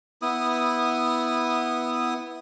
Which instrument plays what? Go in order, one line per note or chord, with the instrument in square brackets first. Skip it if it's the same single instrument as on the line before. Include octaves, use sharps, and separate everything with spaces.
[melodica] B3 E4 D#6